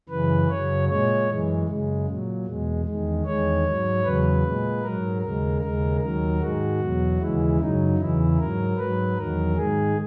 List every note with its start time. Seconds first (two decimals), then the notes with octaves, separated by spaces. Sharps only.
0.09 F#2 C#3 E3 B4
0.49 F#2 C#3 F#3 C#5
0.88 A#2 G#3 C#5
1.28 F#2 E3 G#3
1.67 F#2 C#3 G#3
2.07 A#2 F#3
2.45 E2 B2 G#3
2.86 E2 D#3 G#3
3.25 E2 D#3 G#3 C#5
3.64 G#2 F#3
4.03 E2 C#3 F#3 B4
4.43 A#2 G#3
4.82 G#2 F#3 A#4
5.22 D#2 C#3 G#3 A#4
5.61 D#2 C#3 G#3 A#4
6.01 D#2 D#3 F#3 A#4
6.40 G#2 D#3 G#3 F#4
6.80 E2 B2 F#3
7.19 D#2 C#3 E3 G#3 E4
7.59 F#2 C#3 F#3 D#4
7.98 E2 C#3 E3 E4
8.38 G#2 F#3 A#4
8.77 G#2 F#3 B4
9.16 E2 D#3 F#3 A#4
9.55 G#2 D#3 G#3 G#4